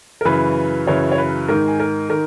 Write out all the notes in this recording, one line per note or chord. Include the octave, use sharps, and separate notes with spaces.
A#4
F#2 C#3 E3 B4
F#2 C#3 E3 C#5
C#5
B4
G#2 D#3 A#4
G#4
A#4
D#3 A#4